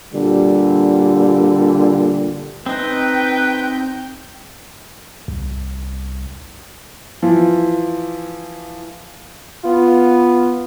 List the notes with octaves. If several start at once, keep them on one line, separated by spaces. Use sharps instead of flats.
A#2 D3 G3
C4 D#4 B4 G5
C2
E3 F3
B3 F4